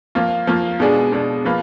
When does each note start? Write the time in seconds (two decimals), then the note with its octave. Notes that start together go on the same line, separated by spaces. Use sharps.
0.15 F3 A#3 F4
0.47 F3 A#3 F4
0.80 B2 G#3 D4 G#4
1.12 B2 G#3 D4 G#4
1.45 F3 A#3 F4 B4